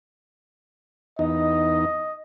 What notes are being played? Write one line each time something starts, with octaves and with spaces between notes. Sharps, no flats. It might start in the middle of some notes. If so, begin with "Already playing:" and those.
E2 D#4 D#5